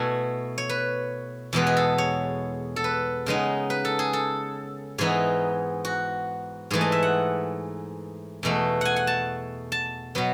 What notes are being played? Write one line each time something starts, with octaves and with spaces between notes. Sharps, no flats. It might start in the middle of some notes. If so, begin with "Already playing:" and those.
Already playing: B2 A3 E4 G#5
C#5
B4
E2 B2 G#3 B3 B4
G#4
A4
C#5
A4
B4
C#3 G#3 B3 D#4
B4
A4
G#4
A4
G#2 E3 B3 D#4 G#4
F#4
G#2 E3 A3 G#4
D#5
E5
F#5
E2 B2 A3
F#5 G#5
F#5
A5
A5
B2 F#3 B3